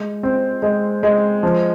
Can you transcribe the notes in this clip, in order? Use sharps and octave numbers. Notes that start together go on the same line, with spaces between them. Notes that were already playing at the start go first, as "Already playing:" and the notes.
Already playing: G#3
C4
G#3
G#3
F3